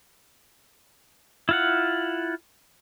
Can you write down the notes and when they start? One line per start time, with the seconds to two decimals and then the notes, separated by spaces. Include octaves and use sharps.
1.49 E4 F4 F#5